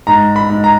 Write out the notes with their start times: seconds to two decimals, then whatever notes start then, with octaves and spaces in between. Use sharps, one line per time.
0.07 G#2 A#5
0.36 B5
0.50 G#2
0.64 A#5